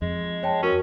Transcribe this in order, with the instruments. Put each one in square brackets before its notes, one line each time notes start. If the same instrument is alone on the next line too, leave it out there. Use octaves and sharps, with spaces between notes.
[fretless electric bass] F2 [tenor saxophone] G#3
[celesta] C#5 G5 A5
[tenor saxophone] C#4 [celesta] F#4 A#4